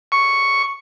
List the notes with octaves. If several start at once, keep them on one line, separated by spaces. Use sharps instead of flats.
C#6